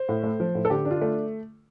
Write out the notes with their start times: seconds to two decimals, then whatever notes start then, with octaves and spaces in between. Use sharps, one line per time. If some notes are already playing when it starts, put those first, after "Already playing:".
Already playing: C5
0.09 A2
0.23 A3
0.40 F3
0.55 A2
0.65 A4
0.70 D3 G4
0.85 D4
0.91 F4
1.01 A3